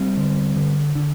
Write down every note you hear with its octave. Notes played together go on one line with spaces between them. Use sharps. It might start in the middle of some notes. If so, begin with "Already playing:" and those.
Already playing: G3 C4
D3
D3
D3